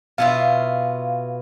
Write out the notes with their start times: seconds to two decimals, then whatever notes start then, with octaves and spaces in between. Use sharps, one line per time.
0.18 B2 E4 F4 F5